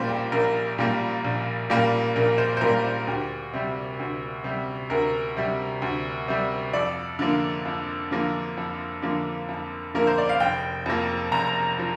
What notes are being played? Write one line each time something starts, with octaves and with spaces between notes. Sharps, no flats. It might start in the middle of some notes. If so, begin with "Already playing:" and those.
Already playing: A#1 A#2 G3 A#3 C5
G4
A#1 A#4
A#2 G3 A#3
A#1
A#2 G3 A#3
A#1 A#4
C5
C5
A#2 G3 A#3 A#4
C5
D2 G4
C3 G3
D2
C3 G3
D2 A#4
C3 G3
D2
C3 G3
F2 D5
D3 F3 A#3
F2
D3 F3 A#3
F2
D3 F3 A#3
F2
D3 F3 A#3 A#4
C5
D5
F5
F1 G5
F2 F3 A#3
F1 A#5
F3